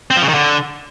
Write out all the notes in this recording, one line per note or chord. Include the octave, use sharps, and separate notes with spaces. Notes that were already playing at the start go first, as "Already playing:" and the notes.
C4
F3
C#3
D#3
D3